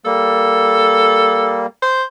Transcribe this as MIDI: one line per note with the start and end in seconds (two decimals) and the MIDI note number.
0.05 1.66 55
0.05 1.66 58
0.05 1.65 69
1.82 2.03 72